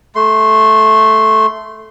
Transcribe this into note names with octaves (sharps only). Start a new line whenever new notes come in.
A3 C6